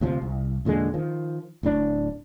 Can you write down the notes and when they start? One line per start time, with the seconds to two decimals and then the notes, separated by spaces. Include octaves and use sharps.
0.01 D2 C3 F3
0.22 C2
0.65 E2 A#2 D3 G#3
0.94 D#3 F3
1.63 D1 A2 D4